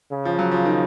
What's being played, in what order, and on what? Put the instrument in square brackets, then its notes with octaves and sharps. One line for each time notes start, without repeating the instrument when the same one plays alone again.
[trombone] C#3
[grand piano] F3
F#3
F3
D#3